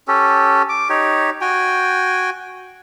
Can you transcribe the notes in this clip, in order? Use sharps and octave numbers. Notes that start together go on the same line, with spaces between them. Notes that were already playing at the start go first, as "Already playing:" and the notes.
C#4 G4 A4
D6
D#4 G4 C#5
F#4 G5 G#5